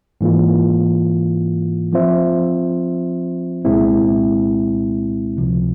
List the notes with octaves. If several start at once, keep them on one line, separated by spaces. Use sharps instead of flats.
G#2 E3 A#3 F4
F3 C4 F4 C5 E5
C2 A#2 G#3 C4 E4
C#2 C3 F3